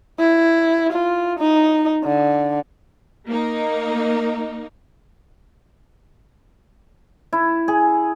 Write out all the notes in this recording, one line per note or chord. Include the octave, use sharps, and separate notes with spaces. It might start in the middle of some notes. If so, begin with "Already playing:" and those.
E4
F4
D#4
D3
A#3 D#4
E4
G#4